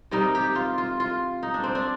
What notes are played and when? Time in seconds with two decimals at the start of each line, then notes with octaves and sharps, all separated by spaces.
0.11 C3 D#3 G3 D#4
0.35 G4
0.55 F4
0.78 F4
1.00 F4
1.43 D#4
1.54 D4
1.64 C4
1.75 D4